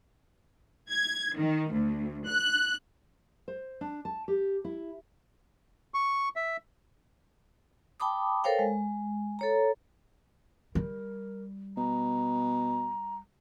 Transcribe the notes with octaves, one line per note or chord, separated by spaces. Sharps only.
G#6
D#3
D2
F#6
C5
D4
A5
G4
E4
C#6
E5
G5 A5 B5 D6 D#6
A4 A#4 C5 C#5 F5 G5
G#3
A4 C#5 A#5
G3 A#4
B2 A#5